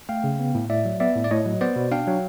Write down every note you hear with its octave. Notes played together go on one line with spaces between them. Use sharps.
A3 F5 G5
C#3
B3
A2
A2 D5 E5
F#3
B3 D5 E5
A2
D5
A2 C#5 D#5
F#3
B3 C5 D5
B2
D4 F5 G5
F#3